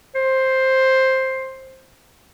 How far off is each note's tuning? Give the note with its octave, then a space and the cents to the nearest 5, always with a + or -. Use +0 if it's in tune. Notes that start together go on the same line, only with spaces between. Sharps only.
C5 +10